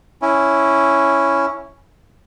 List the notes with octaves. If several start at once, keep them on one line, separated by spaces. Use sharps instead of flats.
C#4 E4